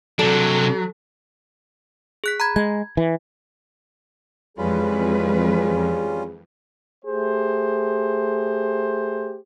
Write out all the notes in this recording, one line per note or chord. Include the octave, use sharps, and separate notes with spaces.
C3 F#3 D4 A4
G#4 F#6 B6
A#5 B5 G#6
G#3 G#6
E3
F2 E3 G3 G#3 C#4 F4 G#4 B4
A3 G4 G#4 C5